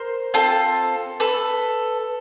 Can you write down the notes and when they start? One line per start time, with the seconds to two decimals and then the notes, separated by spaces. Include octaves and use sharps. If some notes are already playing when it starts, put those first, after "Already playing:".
Already playing: A#4 C5
0.34 C4 F4 A4
1.20 A4 B4